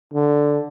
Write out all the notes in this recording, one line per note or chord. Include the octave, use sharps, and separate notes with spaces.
D3